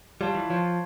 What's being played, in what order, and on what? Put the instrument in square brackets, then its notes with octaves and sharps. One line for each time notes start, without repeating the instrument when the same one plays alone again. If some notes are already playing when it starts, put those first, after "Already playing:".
[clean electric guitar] G3 [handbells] F4 C#5 F5 A5
[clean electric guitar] E3
[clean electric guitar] F3 [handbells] F4 C#5 F5 A5